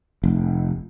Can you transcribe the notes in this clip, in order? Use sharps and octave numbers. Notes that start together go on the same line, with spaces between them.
F1